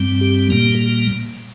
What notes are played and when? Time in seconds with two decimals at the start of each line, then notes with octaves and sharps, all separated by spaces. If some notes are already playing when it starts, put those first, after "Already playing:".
Already playing: G2 G3 C4
0.21 G4
0.50 A#2 G3 A#3